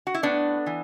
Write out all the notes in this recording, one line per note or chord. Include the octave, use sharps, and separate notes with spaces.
F#4
E4
A2 B3 D4
E3